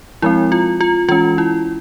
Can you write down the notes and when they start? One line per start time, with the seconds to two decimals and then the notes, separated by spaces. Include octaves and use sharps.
0.22 F3 G#3 C4 E4
0.52 F4
0.81 F4
1.09 E3 G#3 C#4 F4
1.38 E4